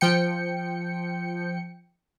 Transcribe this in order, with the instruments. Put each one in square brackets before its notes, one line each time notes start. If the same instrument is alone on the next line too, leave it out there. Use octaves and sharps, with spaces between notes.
[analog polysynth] F3 G5 C#7